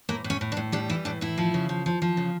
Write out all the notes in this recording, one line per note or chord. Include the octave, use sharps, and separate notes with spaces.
A2 A#3
A2
C#4
A2
D4
A2
G3 D4
E3 E4
A2 D4
A2 E4
F3
C#3
F3
F3
F3
C#3